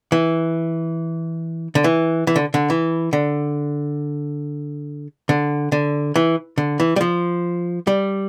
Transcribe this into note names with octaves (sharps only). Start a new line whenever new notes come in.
E3
D3
E3
E3
D3
D3
E3
D3
D3
D3
E3
D3
E3
G3
F3
G3